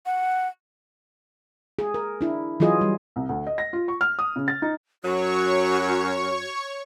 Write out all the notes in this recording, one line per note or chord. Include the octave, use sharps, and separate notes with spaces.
F#5
G#4
A#4
D4 E4
E3 F#3 F4 G#4 D#5
G3
C2
D2
D#5
A#6
F4
C#6
F6
D#6
C#3
A6
D#4
F#2 F#3 F#4 C#5 C#6